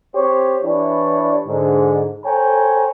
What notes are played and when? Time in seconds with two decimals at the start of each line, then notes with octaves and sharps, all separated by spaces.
0.15 C4 G4 C5 C#5
0.63 E3 D4 E4 G4 C#5 D5
1.47 G#2 D3
2.25 A4 C5 C#5 G5 G#5 A#5